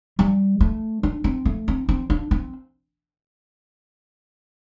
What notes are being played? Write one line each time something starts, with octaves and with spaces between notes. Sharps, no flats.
G3
A3
D4
C4
A3
C4
C4
D4
C4